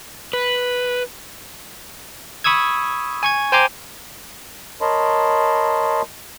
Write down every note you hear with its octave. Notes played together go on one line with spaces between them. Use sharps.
B4
B5 C#6 D#6 E6 G#6
G#5 C#6 G#6
C5 G5 G#5 A#5 C6 D6
A#4 C#5 D#5 A5 B5 C6